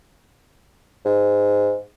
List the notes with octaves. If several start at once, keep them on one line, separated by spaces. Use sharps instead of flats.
G#2